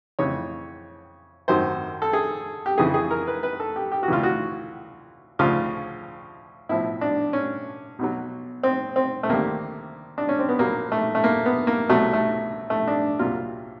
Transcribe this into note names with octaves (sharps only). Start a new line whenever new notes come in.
F2 C#3 E3 C#5
G#1 F#2 D#3 F#3 C5
A4
G#4
G4
F2 C#3 E3 G#4
G#4
A#4
B4
B4
A4
G4
G4
F#4
D2 C#3 E3 F4
F#4
D2 C#3 F3 F4
B1 A2 F3 E4
D4
C#4
B1 B2 F#3
C4
C4
A3
D2 C3 D#3 A#3
D4
C#4
C4
B3
A#1 A#2 F#3 A#3
A3
A3
A#3
B3
A#3
C2 B2 F#3 A3
A3
A3
D4
C2 A#2 F#3 F4